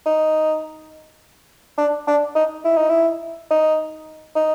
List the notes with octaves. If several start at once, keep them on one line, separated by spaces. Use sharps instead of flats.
D#4
D4
D4
D#4
E4
D#4
E4
D#4
D#4